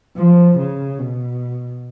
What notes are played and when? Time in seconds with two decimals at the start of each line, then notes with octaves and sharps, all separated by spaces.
0.17 F3
0.58 C#3
0.99 B2